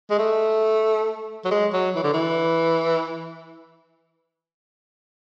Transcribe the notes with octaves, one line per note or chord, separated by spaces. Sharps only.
G#3
A3
F#3
G#3
F#3
E3
D3
E3